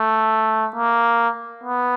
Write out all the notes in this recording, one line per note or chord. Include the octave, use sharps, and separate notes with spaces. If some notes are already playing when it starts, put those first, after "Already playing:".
Already playing: A3
A#3
B3